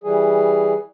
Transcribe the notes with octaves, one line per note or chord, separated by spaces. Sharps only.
E3 G3 G#4